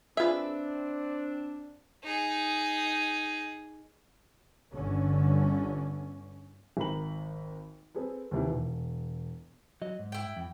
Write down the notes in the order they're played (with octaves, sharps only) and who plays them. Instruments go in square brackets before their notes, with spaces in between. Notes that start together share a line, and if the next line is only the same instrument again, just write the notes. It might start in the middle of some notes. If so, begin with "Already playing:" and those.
[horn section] C4 D4 [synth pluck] F4 G#4 [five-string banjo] B4 E5
[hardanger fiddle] D#4 G#4
[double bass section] G1 D3 C#4
[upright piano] G#1 A#4 A#5 B5 F#7
C4 G#4 A4 B4
D#2 C3 E3
E1
[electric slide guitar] F#3 D#5
G#2
[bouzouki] E4 G5
[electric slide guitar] F2